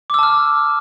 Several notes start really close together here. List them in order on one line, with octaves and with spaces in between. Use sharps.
D6 E6 A5 F6